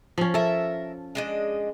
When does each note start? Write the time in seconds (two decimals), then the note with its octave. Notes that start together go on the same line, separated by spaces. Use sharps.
0.18 F3 C#4
0.34 A4 A#4 E5
1.15 G#3 D4 D#5